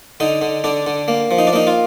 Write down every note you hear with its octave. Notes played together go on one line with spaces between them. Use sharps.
D3 D#4
D3
D3 D4
D3
A#3
F3
D#4
D4
A#3 D#4
F4